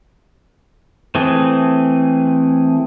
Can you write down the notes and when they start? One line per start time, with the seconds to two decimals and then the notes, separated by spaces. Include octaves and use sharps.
1.15 E3 A3 C4 G#4